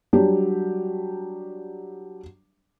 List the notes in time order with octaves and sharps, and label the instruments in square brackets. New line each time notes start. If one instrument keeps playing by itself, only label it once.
[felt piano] F#3 G3 D4 G4